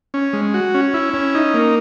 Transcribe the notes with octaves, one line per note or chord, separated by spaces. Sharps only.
C#4
G#3
F#4
C#4
E4
C#4
D#4
A#3